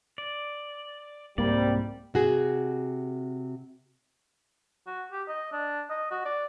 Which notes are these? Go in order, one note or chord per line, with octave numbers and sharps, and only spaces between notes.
D5
C2 G#2 C3 G3 A#3 D5
C3 F#4 G#4
F#4
G4
D#5
D4
D#5
F#4
D5